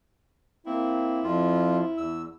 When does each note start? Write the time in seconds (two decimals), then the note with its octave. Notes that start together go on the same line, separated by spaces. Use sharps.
0.66 A#3 C4 E4
1.24 F2 F3 F4
1.98 E2 E6